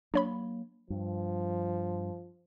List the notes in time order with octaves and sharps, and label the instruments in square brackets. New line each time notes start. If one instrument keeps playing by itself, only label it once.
[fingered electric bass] F#3 A#3 [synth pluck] D4 C#5 B5
[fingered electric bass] G2 [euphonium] F3